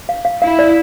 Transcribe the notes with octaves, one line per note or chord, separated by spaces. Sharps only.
F5
F5
E4 F5
D5